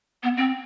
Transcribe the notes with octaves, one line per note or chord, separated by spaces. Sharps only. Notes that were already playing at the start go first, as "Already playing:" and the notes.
B3
C4